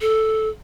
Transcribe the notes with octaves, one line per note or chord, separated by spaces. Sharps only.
A4